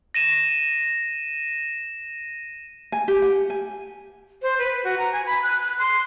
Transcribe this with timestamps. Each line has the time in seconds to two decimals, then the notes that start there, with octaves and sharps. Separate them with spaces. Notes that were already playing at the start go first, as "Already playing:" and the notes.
0.14 A#6 D#7 E7
2.92 G#5
3.08 G4
3.22 F#5
3.50 G#5
4.43 C5
4.59 B4
4.84 F#4
4.98 A#5
5.12 G#5
5.26 B5
5.42 F#6
5.62 F#6
5.79 C6